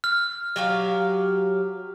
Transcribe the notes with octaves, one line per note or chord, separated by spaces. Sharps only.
F6
F#3 G4 F5